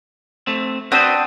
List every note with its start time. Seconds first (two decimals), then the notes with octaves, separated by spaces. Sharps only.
0.47 A3 C4
0.92 C4 D4 F#4 B4 C5 D#6